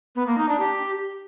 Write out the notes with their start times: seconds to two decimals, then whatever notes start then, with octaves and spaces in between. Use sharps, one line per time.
0.16 B3
0.27 A#3
0.38 D#4
0.49 D4
0.60 G4